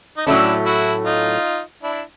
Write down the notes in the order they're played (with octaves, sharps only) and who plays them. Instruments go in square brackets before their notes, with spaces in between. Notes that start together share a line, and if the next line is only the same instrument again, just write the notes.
[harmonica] D#4
[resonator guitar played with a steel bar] A2 F#3 A3 C#4 [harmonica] D4 E4
[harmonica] E4 F#4
D#4 F4
D4 E4